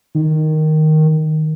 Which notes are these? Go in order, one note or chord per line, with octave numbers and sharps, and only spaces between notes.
D#3